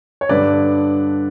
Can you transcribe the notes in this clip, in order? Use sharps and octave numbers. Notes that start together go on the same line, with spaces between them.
C#5
G2 D3 B4 D5